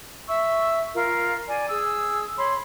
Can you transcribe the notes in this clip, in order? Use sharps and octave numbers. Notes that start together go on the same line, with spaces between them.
E5 C#6 E6
F4 A#4
D5 G#5
G#4 E6
C#5 B5 C6